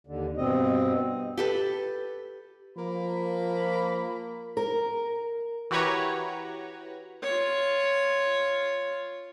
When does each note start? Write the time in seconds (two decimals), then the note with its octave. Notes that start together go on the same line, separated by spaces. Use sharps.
0.07 D#2 D3
0.37 G2 B2 C4 D#5
1.37 G4 A4 B4
2.77 F3 A#3 B5
4.57 A#4
5.71 E3 F#4 G4 B4 C#5 A#5
7.22 F4 C#5